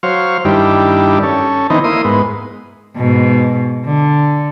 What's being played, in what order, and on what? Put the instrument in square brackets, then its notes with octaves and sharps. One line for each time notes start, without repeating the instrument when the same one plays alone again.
[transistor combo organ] F#3 C5 C#5 F5
G2 D#3 G3 D4 E4
C#4 A4
D#3 E3 B3 C4 D#4
A#3 E4 C6 D#6
G#2 B3
[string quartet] G#2 B2
D3